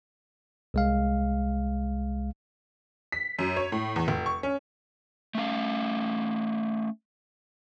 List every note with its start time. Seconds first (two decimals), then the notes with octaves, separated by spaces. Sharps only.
0.74 C2 G#3 F5
3.12 B6
3.39 F#2
3.57 C#5
3.72 A2
3.96 E2
4.08 F1
4.26 C#6
4.43 C#4
5.35 A3 C#4 F5